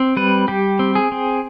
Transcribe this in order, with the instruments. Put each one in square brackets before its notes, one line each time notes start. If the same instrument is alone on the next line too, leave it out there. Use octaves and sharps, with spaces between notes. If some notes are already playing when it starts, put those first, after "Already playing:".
Already playing: [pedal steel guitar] C4
G3 B4
G3 G4
C4
G#4
C4